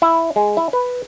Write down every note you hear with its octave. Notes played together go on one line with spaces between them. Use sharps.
E4
G#3
E4
B4